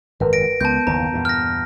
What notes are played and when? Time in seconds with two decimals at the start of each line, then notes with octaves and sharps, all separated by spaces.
0.20 G#1 F#2 A#4 B4
0.33 A#6 D7
0.61 C#2 B3 A5 G6
0.87 F#1 D#2 E3 A#5
1.13 E2 G2 A#2
1.25 F6 A#6